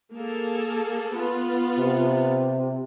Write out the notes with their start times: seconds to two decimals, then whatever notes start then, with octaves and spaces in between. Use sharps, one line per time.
0.14 A#3 G#4 A4
1.14 B3 F4
1.79 C3